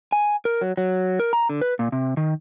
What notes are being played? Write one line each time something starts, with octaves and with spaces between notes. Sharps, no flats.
G#5
A#4
F#3
F#3
A#4
A#5
D3
B4
A#2
C3
D#3